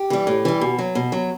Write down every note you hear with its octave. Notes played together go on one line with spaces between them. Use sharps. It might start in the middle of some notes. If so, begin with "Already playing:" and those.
Already playing: G4
E3 G3
A2
E3 G3
B2
F#3
B2
F#3